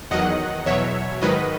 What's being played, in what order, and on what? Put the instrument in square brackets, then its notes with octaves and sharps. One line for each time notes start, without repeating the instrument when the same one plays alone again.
[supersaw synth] E2 D#3 F#3 D#5 F#5
E2 B2 F#3 C#5 E5
G#2 D#3 F#3 B4 D#5